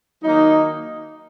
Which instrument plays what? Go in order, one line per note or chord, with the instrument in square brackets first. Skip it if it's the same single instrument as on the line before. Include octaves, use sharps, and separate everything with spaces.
[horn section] D#3 F#3 A#3 D#4